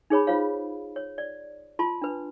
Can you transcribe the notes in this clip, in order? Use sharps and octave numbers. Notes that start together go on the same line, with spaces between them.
D#4 G#4 C#5 B5
F4 C5 C#5 F5
C#5
D5
F4 A5 C6
D4 B4